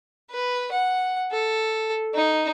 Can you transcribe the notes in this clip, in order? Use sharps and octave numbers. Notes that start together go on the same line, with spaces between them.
B4
F#5
A4
D#4